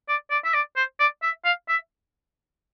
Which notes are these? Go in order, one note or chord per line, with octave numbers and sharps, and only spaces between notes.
D5
D5
E5
D5
C5
D5
E5
F5
E5